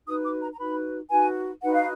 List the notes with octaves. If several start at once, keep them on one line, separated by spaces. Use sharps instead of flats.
D#4 F#4 B4 D#6
D6
A#5
A#5
D#4 F#4 B4 B5
D#4 F#4 B4 G#5
D#4 F#4 B4 F#5
F5